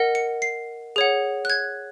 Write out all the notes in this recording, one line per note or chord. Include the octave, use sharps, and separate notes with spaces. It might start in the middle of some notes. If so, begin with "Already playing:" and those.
Already playing: A#4 D#5 F#5
C#7
C7
G#4 C#5 F#5
F#6
G#6